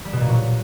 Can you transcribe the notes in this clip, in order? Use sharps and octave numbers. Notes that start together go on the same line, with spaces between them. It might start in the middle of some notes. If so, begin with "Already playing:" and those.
G3
B2
A#2
F#3